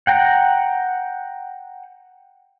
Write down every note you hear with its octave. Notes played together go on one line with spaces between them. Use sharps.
F#5 G5 A#5